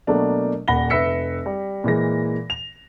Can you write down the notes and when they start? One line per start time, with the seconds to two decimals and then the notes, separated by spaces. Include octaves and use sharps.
0.07 B2 F#3 A3 A#3 D4
0.68 D#1 A#2 F#5 B5 A#6 G7
0.90 F1 B4 E5 E6 B6 C#7
1.46 G3
1.84 A#2 E3 G#3 A#6
2.50 F7